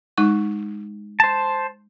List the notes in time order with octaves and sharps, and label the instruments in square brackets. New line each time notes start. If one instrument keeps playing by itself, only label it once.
[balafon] G#3 D#4 C#6
[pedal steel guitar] C5 A5